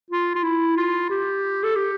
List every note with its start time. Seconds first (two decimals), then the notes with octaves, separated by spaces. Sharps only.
0.10 F4
0.35 F4
0.43 E4
0.77 F4
1.10 G4
1.63 A4
1.76 G4